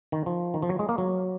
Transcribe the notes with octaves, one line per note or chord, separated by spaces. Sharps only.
D#3
F3
D#3
F3
F#3
G#3
A#3
F#3